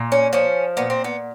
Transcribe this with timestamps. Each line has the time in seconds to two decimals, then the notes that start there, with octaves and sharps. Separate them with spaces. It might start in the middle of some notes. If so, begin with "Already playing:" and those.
Already playing: A#2
0.12 C#4
0.33 F3 C#4
0.77 A#2 B3
0.90 C4
1.04 B3